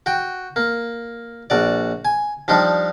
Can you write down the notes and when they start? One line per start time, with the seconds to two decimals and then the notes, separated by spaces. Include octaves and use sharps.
0.06 F#4 G5
0.56 A#3
1.50 A#1 F#4 D5
2.05 G#5
2.48 F3 G3 D4 D#4